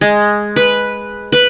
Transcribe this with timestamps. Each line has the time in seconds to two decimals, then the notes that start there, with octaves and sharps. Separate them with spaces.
0.01 G#3
0.56 B4
1.32 B4